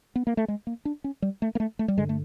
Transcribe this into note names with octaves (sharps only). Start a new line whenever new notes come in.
B3
A#3
A3
G#3
A#3
D4
C#4
G3
A3
A#3
A3
A3
G3
G2 D3 G#3
A3